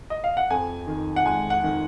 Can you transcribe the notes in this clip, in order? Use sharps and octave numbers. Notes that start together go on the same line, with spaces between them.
D#5
F5
F#5
F2 G#5
D#3
F#5
G#3 G#5
F#5
D#3